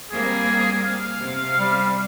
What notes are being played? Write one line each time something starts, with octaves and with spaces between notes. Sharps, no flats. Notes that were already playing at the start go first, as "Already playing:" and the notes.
G3 A#3 C4 G#4
F5
C3
G3